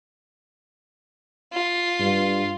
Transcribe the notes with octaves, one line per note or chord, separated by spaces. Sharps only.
F4
G2